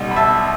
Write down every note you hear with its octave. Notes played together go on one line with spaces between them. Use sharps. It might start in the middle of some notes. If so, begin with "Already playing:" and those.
Already playing: B1 B2 G3
B5
E5 A5